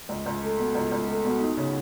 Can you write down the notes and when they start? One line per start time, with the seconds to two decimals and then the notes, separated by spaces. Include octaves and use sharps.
0.09 C#2
0.26 C#2
0.43 A3
0.59 B2
0.75 C#2
0.92 C#2
1.08 A3
1.25 B2
1.41 D#4
1.57 C#3